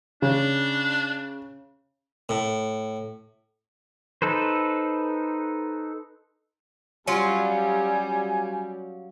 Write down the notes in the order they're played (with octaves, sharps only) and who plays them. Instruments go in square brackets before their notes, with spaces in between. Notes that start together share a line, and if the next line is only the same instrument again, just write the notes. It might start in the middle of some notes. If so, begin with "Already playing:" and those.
[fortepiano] C#3 [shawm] D4
[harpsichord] A2
[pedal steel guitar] D#4 A4 B4 C5
[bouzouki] F#3 C#4 F4 [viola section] G3 [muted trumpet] G#5